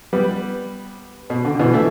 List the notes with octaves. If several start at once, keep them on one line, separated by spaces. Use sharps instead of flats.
G3 B3
B2
D3
D3
B2 E3
E3 A3